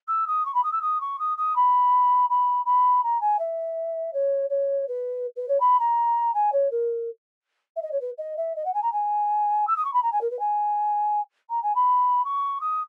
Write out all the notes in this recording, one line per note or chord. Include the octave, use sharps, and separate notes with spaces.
E6
D#6
C#6
B5
D#6
E6
D#6
C#6
D#6
D#6
B5
B5
B5
A#5
G#5
E5
C#5
C#5
B4
B4
C#5
B5
A#5
G#5
C#5
A#4
E5
D#5
C#5
B4
D#5
E5
D#5
F#5
G#5
A#5
G#5
E6
D#6
C#6
B5
A#5
G#5
A#4
B4
G#5
A#5
G#5
B5
C#6
D#6